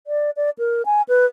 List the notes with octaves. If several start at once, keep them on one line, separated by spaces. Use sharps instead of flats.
D5
D5
A#4
G#5
B4